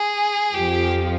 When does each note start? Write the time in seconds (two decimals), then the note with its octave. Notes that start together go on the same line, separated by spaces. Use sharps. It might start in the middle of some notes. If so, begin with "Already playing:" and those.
Already playing: G#4
0.54 F2 F3 G4